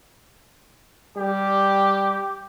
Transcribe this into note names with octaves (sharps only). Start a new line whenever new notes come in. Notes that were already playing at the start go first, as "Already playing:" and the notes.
G3 G4